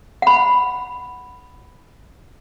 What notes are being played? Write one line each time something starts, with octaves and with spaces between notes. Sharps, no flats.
F#5 B5